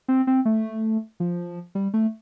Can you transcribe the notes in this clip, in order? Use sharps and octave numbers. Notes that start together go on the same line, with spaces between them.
C4
C4
A3
F3
G3
A3